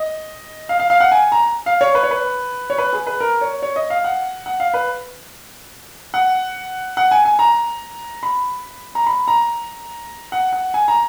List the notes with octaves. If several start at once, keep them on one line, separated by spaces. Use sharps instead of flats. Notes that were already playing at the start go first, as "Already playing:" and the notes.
Already playing: D#5
F5
F5
F5
F#5
G#5
A#5
F5
C#5
B4
C#5
B4
C#5
B4
G#4
B4
A#4
C#5
C#5
D#5
F5
F#5
F#5
F5
B4
F#5
F#5
G#5
G#5
A#5
B5
A#5
B5
A#5
F#5
F#5
G#5
A#5